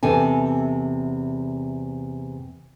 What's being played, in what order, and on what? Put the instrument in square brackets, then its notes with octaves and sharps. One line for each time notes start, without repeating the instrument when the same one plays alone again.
[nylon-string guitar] E2 C3 A4 G#5